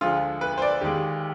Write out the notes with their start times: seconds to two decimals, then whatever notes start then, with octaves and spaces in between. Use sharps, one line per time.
0.01 D2 D3 F3 G#3 F4
0.41 B4
0.58 C5
0.62 D5
0.81 D#2 D#3 G#3 G4